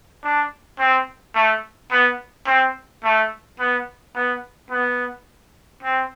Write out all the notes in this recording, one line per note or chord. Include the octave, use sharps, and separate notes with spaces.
D4
C4
A3
B3
C4
A3
B3
B3
B3
C4